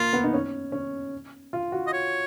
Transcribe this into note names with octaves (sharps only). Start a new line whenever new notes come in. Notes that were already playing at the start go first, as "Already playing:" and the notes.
Already playing: A#3 F4
B3
D#4
C#4
C#4
F4
F#4
D#5
C#5